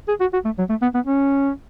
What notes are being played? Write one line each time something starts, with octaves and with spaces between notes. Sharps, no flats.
G#4
F#4
F#4
A3
F#3
A3
B3
B3
C#4